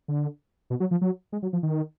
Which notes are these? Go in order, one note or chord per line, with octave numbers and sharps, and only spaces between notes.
D3
B2
F#3
F3
F#3
G#3
F#3
F3
D#3